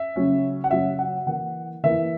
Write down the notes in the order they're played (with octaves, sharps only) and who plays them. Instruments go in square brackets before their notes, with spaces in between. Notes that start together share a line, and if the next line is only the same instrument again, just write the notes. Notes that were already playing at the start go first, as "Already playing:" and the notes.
Already playing: [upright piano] E5
C#3 F#3 C#4
F#5
C#3 F#3 C#4 E5
F#5
E3 A#3 E4 F#5
E3 A#3 E4 E5